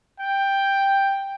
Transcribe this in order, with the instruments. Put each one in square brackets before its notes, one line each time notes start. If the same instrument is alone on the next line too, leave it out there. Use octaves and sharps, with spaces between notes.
[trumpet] G5